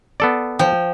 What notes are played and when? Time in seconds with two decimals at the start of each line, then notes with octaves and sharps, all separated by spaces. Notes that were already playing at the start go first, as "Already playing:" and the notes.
0.20 B3 A4 D5
0.59 F3 G5